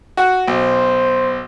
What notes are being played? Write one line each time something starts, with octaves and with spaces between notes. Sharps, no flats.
F#4 F#5
B1 C5